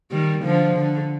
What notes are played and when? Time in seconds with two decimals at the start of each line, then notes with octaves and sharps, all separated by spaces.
0.11 D#3 G3
0.44 D3 F3
0.76 D3